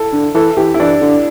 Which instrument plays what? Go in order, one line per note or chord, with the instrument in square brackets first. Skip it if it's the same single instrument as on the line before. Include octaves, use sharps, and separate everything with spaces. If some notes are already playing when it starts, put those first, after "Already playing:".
Already playing: [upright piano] E4 A4
[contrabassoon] D3
[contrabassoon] E3 [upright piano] A4
[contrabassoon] E3 [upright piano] G4
[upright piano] E4
[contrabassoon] E3 [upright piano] D4
[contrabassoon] D3